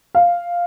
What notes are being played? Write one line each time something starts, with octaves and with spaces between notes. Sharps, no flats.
F5